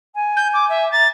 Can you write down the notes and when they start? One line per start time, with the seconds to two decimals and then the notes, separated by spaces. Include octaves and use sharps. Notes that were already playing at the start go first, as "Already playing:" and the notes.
0.15 G#5
0.36 G6
0.54 D6
0.69 E5
0.92 A#5 A6